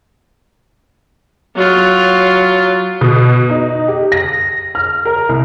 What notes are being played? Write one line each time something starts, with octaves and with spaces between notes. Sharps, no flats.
F#3 F4
B2
D#4
G4
A#6
F6
A#4
C2